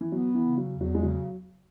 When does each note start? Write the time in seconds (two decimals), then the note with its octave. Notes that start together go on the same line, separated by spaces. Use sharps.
0.01 E3
0.12 F#3 B3
0.35 E3
0.42 C#3
0.58 F#3
0.73 E2
0.81 F#3
0.95 G#3
1.03 C#3 F#3